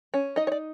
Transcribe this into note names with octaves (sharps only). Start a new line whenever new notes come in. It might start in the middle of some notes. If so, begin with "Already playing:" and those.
C#4
D#4 D#5
C#5
D5